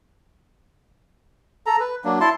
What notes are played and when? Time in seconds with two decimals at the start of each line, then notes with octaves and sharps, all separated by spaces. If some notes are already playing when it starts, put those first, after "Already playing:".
1.66 A4 A#5
1.80 B4
2.04 F#3 A#3 D4
2.21 E4 A5 C6